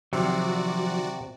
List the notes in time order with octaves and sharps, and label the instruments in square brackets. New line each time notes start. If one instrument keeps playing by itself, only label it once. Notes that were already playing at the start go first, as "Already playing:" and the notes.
[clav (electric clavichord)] C3 [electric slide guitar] D#3 F3 F#3 [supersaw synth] F#4 D5